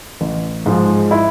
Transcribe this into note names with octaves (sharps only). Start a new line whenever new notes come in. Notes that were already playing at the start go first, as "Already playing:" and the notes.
A1
G#2 F3 G#3
E4